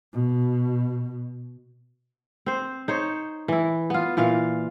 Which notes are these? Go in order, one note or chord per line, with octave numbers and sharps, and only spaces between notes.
B2
C4 C5
D#4 C5 C#5
E3 E4
B3 F4
A#2 E3 F4 F5